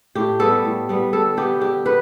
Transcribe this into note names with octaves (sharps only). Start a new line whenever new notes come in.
A2 G4
G3 B3 A4
A2
G3 B3
D3 A4
B3 G4
D3 G4
B3 B4